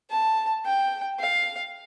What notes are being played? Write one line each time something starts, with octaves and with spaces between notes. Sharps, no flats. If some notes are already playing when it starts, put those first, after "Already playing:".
A5
G5
F5